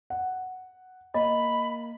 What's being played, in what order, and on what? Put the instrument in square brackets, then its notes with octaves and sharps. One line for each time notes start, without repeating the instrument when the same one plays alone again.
[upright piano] F#5
[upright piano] A#3 [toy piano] D#5 [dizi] B5